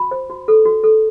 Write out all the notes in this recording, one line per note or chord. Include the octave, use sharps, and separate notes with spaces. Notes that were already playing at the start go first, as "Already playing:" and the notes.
Already playing: F#4 B5
C5
F#4
A4
F#4
A4